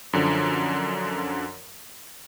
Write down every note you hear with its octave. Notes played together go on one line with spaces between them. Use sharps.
F#2 D3 F3